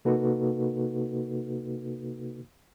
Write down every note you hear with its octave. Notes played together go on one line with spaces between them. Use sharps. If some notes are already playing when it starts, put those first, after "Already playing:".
C3 A#3 D#4 F#4 A4 B4